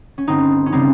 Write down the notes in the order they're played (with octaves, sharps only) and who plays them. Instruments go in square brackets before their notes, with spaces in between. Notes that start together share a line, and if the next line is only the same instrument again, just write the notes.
[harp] C#4
G1 C4 D#4
C#4
C#3 G3 C4 D#4